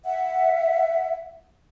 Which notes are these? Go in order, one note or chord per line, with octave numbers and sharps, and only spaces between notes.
E5 F#5